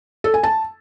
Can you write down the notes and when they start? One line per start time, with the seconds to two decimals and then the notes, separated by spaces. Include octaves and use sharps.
0.24 A4
0.34 G#5
0.43 A5